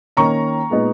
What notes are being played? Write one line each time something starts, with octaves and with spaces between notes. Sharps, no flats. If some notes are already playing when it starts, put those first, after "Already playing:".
D#3 A#3 C#4 A#5 C#6
A#2 G#3 B3 D#4